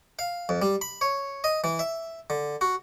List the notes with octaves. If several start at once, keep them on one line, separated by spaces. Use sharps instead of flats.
F5
F2
G3
B5
C#5
D#5
E3
E5
D3
F#4